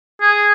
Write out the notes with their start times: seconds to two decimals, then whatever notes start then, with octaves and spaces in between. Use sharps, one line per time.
0.21 G#4